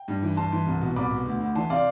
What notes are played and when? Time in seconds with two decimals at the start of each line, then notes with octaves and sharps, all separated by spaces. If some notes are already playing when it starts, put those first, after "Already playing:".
Already playing: G5
0.08 G2
0.22 E3
0.37 G2 A5 C6
0.52 E3
0.66 C2
0.82 B2
0.96 C2 B5 D6
1.11 B2
1.26 D2
1.40 D2
1.55 E3 A5 C6
1.70 C3 D5 F5